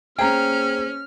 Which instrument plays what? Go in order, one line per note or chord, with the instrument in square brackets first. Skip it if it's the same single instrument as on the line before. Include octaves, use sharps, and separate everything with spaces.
[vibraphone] A#3 G#4 C5 [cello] C#4 [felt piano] G5 A#5 [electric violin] F6